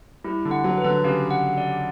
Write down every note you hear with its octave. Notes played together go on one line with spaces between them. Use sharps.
G3 E4
D3
F#5
F#3
B4
D3
C#3 G4
F#5
D5